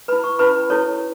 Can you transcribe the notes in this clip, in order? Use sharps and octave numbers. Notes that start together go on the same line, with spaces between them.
E4 B4 B5
C#6
C#4 E4 B4 B5
E4 A4 C#5